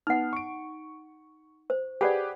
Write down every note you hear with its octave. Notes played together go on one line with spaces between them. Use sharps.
B3 D#4 F#5 F6
C#6 D7
C5
G4 G#4 B4 D5 F#5 G5